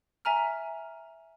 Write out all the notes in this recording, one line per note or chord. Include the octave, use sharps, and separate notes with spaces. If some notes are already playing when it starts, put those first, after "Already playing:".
E5 G#5 A#5 F6